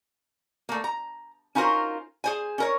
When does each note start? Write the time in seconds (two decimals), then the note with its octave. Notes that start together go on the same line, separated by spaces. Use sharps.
0.69 A3 A#3
0.84 A#5
1.55 C#4 D#4 F4 F#4 A#4 C5
2.24 G#4 C5 G#5
2.58 C#4 A#4 C#5